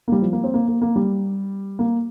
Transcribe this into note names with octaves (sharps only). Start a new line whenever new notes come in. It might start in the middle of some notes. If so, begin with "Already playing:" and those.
A#3
G3
F3
A#3
C4
A#3
A#3
A#3
G3
A#3